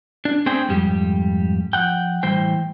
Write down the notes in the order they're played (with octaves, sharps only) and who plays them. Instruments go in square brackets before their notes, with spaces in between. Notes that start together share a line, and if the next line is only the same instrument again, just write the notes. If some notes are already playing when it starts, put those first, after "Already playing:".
[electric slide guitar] D4
A3 C4 D4 G#4 C5 G5
F2 G#2 G3 G4
F3 F#5 G5
A2 E3 G3 C5 G5